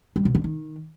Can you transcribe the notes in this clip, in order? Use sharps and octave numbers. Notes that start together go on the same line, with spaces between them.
G3
B2
D3
D#3